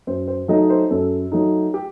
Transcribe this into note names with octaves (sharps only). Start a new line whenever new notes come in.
F#2 C5
C5
F#3 A3 D#4 D#5
C5
F#2 A4
F#3 A3 D#4
G4